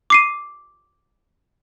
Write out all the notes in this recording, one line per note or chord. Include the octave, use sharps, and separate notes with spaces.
D6 C7 D#7